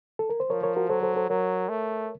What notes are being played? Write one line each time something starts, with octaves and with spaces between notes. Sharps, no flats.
A4
A#4
C5
F3 A#4 C#5
A#4 C#5
F#4 A#4
F#3 A4 C5
A4 C5
A4 C5
F#3 A#4 C#5
A3